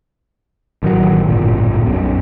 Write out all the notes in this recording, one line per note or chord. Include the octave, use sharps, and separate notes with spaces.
A1 D#3 F#3
D1 G1 A#2
B1 F#2